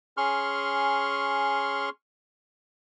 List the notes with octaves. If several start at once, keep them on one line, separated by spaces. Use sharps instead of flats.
C#4 G#4 C6 C#6 F6